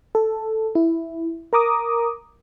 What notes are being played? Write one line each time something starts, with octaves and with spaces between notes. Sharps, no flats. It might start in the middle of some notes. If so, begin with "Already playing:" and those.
A4
E4
A#4 A#5 D6 D#6